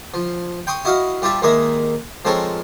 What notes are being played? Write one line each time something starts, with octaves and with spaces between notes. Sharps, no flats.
F3
G5 C6 C#6 D#6
E4 F#4 D#5 F5 F#5
G3 F4 G4 E5 A5
D#2 G#3 A#3 D#5 E5
F3 G#3 C4 A4 A#4 C#5